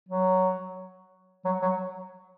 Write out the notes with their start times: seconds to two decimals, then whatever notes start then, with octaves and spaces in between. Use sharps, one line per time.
0.09 F#3
1.45 F#3
1.62 F#3